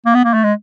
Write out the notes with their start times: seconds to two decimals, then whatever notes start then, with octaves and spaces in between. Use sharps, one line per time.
0.06 A#3
0.15 B3
0.24 A#3
0.34 A3
0.44 G#3